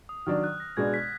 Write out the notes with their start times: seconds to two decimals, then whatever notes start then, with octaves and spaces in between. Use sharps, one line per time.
0.09 D#6
0.26 D#3 F#3 D4 F6
0.44 F#6
0.60 A#6
0.77 B2 G#3 D4 G#6
0.94 B6